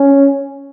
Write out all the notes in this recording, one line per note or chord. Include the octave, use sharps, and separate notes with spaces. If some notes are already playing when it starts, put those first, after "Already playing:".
Already playing: C#4